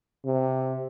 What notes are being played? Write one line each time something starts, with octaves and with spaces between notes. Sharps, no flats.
C3